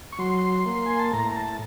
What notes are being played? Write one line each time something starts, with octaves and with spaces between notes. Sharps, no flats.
C#6
F#3 C6
A#3
G#5
A5
A2 A#5
A#5
A5